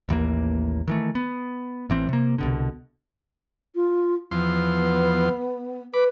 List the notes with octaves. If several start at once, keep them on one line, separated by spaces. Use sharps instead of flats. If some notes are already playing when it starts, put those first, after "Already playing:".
A1 D#2 E3 A#3
D#3 E3 A3
B3
A1 E3 C4
C3 A#3
C2 B2 D3
F4
E2 F3 B3 C6
B4 B5 D6